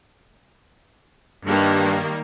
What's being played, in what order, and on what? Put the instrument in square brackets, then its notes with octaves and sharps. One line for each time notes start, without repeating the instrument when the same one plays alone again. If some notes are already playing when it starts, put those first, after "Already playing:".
[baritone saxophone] G2 [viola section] D#3 G3 A#3